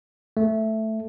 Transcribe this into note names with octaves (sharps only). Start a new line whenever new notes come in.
A3